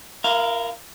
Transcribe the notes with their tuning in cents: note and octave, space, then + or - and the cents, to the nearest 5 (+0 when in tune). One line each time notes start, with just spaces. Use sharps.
E4 +35 A#4 +0 F5 -5